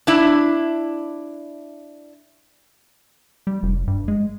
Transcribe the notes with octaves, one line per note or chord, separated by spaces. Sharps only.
D4 E4
G3
F1
G2
G#3